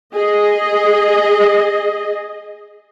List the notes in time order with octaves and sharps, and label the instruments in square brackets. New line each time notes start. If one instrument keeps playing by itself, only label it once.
[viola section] G#4 D#5